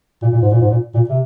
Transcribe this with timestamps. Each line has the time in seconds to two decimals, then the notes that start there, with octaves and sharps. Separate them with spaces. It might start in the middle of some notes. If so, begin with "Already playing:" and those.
0.22 A#2
0.33 A#2
0.42 G#2
0.51 A#2
0.61 G#2
0.71 A#2
0.94 A#2
1.09 C3